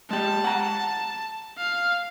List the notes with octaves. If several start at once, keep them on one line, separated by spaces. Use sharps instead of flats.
G#3 G4 A5
F#5 A#5
F5